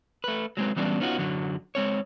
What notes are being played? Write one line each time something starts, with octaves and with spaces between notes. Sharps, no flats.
A3 B4
F#3 G#3 C4 B4
E3 F#3 G3 B3 C#4 D4
B3 C#4 D#4 F4 F#4
F#2 D3 F#3
G#3 C4 C#5